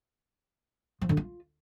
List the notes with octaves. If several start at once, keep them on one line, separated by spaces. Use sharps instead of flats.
F3
D3
F4